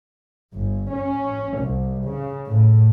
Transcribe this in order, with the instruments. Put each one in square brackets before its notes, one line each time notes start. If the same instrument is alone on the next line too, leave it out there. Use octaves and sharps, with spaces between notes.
[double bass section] G1
C#4
C2
C#3
A2